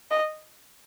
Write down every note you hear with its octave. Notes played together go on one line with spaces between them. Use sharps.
D#5